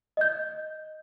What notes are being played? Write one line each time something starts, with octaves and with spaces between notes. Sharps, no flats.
D#5 G6